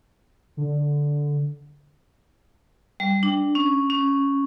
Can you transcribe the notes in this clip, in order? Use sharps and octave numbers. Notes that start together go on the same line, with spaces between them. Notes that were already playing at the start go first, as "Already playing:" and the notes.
D3
G3
D4
C#4
C#4